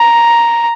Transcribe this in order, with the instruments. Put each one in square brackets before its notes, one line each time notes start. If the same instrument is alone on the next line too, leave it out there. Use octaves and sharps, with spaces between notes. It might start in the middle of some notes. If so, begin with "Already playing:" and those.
Already playing: [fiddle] A#5